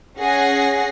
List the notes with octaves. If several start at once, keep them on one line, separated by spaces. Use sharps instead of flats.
C#4 G#4 F#5 A#6 C7